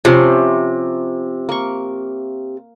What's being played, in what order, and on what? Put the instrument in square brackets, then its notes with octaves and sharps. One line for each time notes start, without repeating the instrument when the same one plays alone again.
[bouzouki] C3 [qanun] F3 C#4 C6
[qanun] A#3 C#6